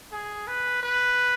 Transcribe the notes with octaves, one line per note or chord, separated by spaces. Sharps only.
G#4
B4
B4